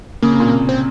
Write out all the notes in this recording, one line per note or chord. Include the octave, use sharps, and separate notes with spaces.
C#3 A#3
C3
A#2
C3
C4